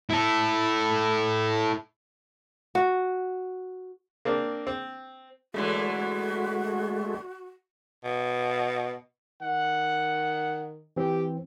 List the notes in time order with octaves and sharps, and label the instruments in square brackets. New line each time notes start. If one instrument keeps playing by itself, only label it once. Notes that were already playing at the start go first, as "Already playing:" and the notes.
[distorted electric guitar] E4 A4
[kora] F#4
[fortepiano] A#3 C4 D4
C4
[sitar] F#2 D3 E3 [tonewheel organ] G#3 A3 [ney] F#4
[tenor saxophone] B2
[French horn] D#3 [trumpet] F#5
[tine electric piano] E3 C4 [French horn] G4